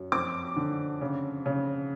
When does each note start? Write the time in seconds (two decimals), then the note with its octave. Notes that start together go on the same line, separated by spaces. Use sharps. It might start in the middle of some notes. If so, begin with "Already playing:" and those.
Already playing: F#2
0.12 F2 D6
0.56 D3
1.01 C#3
1.46 C#3